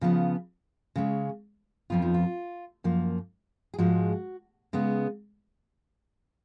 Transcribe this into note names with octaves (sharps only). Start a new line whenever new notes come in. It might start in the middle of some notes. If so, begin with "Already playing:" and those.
C#3 F3 B3
C#3 G#3 C#4
F2 F3 B3 F4
D#4
F4
F#2 F3 A#3
G#4
G#2 F3 G#3 F#4
C#3 G#3 B3